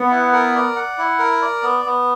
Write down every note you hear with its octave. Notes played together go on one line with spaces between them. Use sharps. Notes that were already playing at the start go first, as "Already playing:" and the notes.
Already playing: B3 F#5
E4
A#4
D5
F#5
E4
A#4
D5
B3
B3